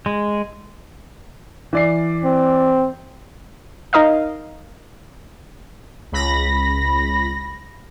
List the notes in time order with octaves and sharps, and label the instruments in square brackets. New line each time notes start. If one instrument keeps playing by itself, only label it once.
[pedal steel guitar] G#3
[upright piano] E3 D5 C7
[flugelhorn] C4
[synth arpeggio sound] D#4 A#4 D#5 F5
[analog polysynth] C#2 B5 A#6